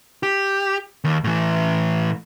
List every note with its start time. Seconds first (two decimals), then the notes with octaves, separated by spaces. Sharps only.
0.23 G4
1.04 D#2
1.24 A2 E3